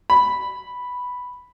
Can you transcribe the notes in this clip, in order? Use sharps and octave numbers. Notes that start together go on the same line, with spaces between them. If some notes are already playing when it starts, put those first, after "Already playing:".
B5